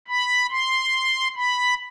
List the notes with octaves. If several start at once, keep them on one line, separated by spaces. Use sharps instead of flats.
B5
C6
B5